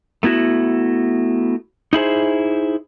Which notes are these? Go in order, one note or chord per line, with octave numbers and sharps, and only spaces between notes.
A3 B3 E4 F#4
D#4 E4 G#4 C5